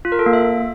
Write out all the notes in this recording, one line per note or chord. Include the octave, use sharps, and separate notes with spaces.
F4
A#4
A4
A#3
E5